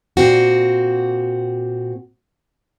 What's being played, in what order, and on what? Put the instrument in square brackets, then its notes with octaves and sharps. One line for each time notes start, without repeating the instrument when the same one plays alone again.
[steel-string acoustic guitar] A#2 C4 F#4